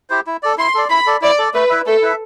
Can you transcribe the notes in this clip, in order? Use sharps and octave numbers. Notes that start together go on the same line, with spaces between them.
E4 G4 C5
E4
A4 D5
E4 C6
A4 D5
E4 B5
A4 D5
E4 D5
A4 D5
A3 B4
E4 B4 E5
A3 A4
E4 B4 E5